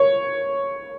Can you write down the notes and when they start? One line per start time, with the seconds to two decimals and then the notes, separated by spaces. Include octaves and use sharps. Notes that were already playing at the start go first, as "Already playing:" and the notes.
Already playing: C#5